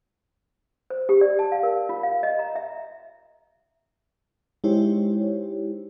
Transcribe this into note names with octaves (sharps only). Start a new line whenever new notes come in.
C5
G4
D5
A5
F5
A#4
F4
F5
D#5
A#5
E5
G#3 D#4 E4 G4 C5 C#5